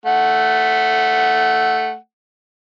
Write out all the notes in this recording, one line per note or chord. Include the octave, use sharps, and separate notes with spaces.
A3 F#5